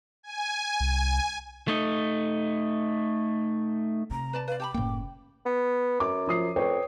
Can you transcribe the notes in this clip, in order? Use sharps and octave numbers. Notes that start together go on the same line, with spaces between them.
G#5
C2
A3 D#4
C3 A#5
B4 D5 A5
B4 D5 F5
G4 A5 B5 D6
F#1 A2 C#3 A#3 G5
B3
F#2 D6
F3 D#6 C7
F2 B4 C#5 G5